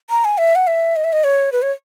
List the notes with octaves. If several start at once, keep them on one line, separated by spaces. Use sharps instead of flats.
A#5
G#5
E5
F#5
E5
D#5
E5
D#5
C#5
B4
C#5